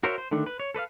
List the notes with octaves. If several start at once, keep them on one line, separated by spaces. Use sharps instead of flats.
F#4 A#4 C5 C#5 E5
C5
D3 D#3 A3 D4
B4
C#5
A4 B4 D5 F5